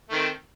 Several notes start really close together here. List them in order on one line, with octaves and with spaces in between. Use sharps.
A3 D#3 C4